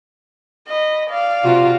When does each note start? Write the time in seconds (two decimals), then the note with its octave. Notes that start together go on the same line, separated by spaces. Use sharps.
0.67 D#5 B5
1.10 D5 F5
1.43 C3 F4 F#4